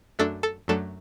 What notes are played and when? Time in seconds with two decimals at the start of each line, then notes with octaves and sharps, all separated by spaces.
0.19 F#2 F#3 A3 D4 A4
0.43 A4
0.68 F#2 F#3 A3 D4 A4